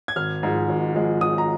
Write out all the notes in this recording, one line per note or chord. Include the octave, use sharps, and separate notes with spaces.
G#6
G#1 F6
G#2 F3 G#3
G#1
G#2 F3 G#3
G#1 D#6
A#5